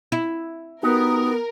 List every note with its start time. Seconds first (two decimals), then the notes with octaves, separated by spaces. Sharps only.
0.12 E4
0.83 B3 D#4 F#4 G4 A#4